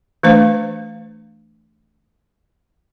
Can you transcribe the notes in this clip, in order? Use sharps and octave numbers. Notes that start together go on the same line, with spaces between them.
E3 A3 D4 C5 F5